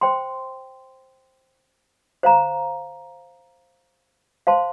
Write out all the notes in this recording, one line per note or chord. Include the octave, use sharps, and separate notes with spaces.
C5 G5 C6
C5 F5 A#5
C5 F5 A5 C6